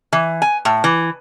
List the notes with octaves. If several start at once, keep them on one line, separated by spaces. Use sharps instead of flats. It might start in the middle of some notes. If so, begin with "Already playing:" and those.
E3
G#5
A2
E3